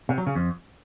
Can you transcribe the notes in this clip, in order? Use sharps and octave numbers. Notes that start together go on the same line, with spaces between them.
C3
F#3
C#3
F2